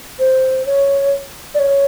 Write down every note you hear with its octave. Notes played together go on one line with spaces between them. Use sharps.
C5
C#5
D5
C#5